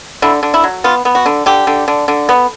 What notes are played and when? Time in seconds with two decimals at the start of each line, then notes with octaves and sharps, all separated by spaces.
0.22 D3 E4
0.43 D3
0.54 E4
0.64 F#3
0.84 B3 F4
1.05 B3
1.15 F#4
1.26 D3
1.46 D3 G4
1.67 D3
1.88 D3
2.08 D3
2.29 B3